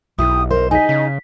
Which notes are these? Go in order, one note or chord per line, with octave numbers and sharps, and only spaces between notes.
B1 E4 G4 D#6
A#4 C5
D#4 G#4 D#5 G#5 B6
C#3 B6